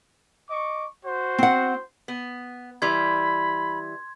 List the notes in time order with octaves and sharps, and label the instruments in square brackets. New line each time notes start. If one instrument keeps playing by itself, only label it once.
[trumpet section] D#5 C#6 D6
F#4 C5
[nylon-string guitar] C4 F#5
[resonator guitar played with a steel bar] B3
[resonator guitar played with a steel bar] E3 G3 [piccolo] B5 [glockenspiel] C6 G#6